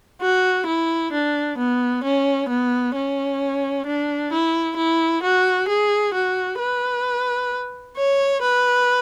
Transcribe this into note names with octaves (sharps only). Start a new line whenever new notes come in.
F#4
E4
D4
B3
C#4
B3
C#4
D4
E4
E4
F#4
G#4
F#4
B4
C#5
B4